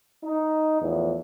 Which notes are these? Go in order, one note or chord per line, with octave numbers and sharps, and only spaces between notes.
D#4
E2 A2 F3